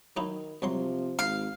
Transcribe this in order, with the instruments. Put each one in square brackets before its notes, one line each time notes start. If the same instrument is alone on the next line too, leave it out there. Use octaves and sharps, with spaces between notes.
[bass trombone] D#3 [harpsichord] F#3 D#4 E4
[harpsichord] C2 F#3 C6 [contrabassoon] C3 [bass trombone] F3
[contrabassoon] G#1 [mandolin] F5 [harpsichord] G5